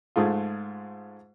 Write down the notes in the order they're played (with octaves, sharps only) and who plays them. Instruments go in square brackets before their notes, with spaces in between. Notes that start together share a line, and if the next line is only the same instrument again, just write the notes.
[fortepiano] G#2 G#3 A3 F4